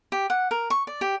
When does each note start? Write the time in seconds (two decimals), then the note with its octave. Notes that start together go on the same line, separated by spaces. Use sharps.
0.12 G4
0.30 F#5
0.51 A#4
0.70 C#6
0.87 D5
1.01 G4